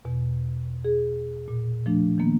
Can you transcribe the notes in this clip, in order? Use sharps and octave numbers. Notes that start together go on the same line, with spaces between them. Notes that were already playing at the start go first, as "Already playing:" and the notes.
E2 B2
G#4
A#2
F3 A3 D4
D#3 F3 A#3 B3